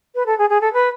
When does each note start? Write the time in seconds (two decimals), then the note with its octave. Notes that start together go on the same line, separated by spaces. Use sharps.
0.15 B4
0.26 A4
0.39 G#4
0.50 G#4
0.61 A4
0.73 B4